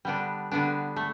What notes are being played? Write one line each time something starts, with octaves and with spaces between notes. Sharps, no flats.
D3 G3 B3 D4
D3 G3 B3 D4
A3